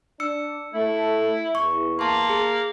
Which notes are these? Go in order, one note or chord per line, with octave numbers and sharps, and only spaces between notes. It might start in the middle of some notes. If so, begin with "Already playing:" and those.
D4 E6 C#7
A3 E4
E2 C#6
A#3 A5 C6
G#4